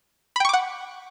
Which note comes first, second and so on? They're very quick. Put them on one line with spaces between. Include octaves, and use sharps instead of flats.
B5 G5 C#6 D6 F#5